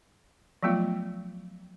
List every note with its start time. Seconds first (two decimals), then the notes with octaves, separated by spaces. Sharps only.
0.63 F3 F#3 A3 B3 F4